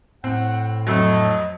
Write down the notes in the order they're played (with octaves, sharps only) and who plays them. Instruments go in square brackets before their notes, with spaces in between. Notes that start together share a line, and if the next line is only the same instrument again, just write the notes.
[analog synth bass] A2 [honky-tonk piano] C4 [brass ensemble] F#5
[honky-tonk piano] F2 F#3 [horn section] A3 E4 A4 [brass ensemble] D#5